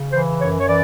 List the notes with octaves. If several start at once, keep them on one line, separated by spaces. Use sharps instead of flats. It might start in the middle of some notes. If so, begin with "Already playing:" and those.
Already playing: C#3
E3 C5
F#2 C#5
C#5
E3 D5